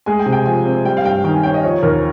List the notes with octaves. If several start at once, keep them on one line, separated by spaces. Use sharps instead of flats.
G#3 G#5
G5
C3
G5
F3 G#5
C4
G3 G5
F5
G2 G5
D#3 G5
G#5
C#4 G5
D#5
F3 C#5
D#2 A#4